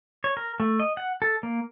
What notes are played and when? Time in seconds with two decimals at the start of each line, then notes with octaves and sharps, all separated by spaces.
0.24 C#5
0.37 A#4
0.60 A3
0.80 D#5
0.97 F#5
1.22 A4
1.43 A#3